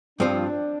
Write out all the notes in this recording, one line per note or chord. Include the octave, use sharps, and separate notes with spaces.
G2 F3 C4 D4 F4